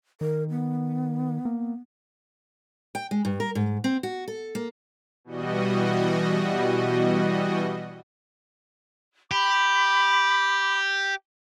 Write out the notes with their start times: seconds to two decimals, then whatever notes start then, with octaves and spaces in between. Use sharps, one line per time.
0.21 D#3 A#4
0.50 B3
1.45 A#3
2.95 G5
3.11 G#3
3.25 G2
3.40 A#4
3.55 G#2
3.84 C4
4.03 F#4
4.28 A4
4.55 A#3
5.24 B2 E3 G3 F#4 D#5
9.31 G4 B5 D6